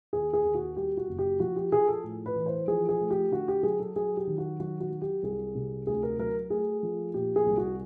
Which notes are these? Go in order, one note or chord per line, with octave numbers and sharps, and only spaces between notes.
D#2 G#4
G#4
D#2
F#4
G3 G4
F#4
F#1
G4
F3 F#4
G4
F3 G#4
A4
A2
B4
E3
C5
F3 G#4
G#4
A3
G4
D3 F#4
G4
F#3 G#4
A4
F#3 G#4
G4
D#3
F#4
F#3 F#4
F#4
F#3
G4
C2 G#4
C3
D2 G#4
A#4
F#3 A#4
A3 G#4
F3
A#2 G4
G#4
C2
F#4